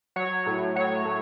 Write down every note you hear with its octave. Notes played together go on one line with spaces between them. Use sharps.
F#3 C#5
A2
F#3 C#5
A2